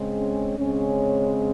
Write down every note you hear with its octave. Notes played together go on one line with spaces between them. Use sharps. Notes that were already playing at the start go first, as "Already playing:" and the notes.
Already playing: C#3 G#3 C4
C#4
C#3 G#3 C4 C#4